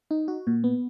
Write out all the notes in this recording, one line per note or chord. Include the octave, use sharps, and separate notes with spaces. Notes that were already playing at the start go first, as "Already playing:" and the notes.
D#4
F#4
A#2
B3